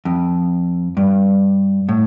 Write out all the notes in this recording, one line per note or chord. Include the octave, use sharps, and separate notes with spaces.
F2
G2
A2